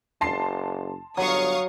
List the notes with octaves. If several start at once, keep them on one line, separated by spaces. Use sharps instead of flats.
F#1 A5 C6 C7
G1 F#3 F5 C#6 D#6